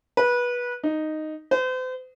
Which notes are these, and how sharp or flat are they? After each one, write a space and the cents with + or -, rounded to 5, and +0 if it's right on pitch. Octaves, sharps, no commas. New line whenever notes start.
B4 -20
D#4 -5
C5 -40